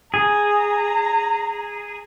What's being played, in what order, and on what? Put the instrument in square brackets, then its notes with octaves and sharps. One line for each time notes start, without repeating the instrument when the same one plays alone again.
[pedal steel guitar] G#4 [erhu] A#5